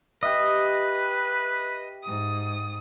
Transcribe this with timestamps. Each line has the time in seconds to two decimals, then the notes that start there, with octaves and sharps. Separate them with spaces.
0.23 G4 B4 D#5 E5
2.03 G#2 D#6